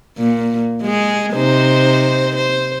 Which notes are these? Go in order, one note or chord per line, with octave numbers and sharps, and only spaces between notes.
A#2
G#3 G#4
C3 D#4 C5
C5